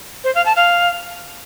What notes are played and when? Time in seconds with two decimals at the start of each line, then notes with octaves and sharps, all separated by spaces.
0.24 C5
0.35 F5
0.45 A5
0.56 F5